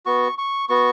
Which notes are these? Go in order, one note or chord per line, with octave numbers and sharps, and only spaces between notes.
B3 F#4 C#6
C#6
B3 F#4 C#6